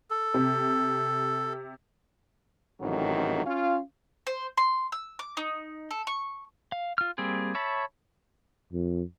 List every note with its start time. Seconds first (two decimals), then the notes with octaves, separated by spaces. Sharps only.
0.10 A4
0.34 C3
2.80 A1 F2 G#2 C3 D#3 F#3
3.46 C#4 F4 F5
4.27 C5
4.57 C6
4.92 E6
5.19 D6
5.37 D#4
5.91 A4
6.07 C#6
6.72 F5
6.98 F4 F6
7.18 G3 A#3 C4 G#4
7.55 C#5 E5 A5 B5
8.73 F2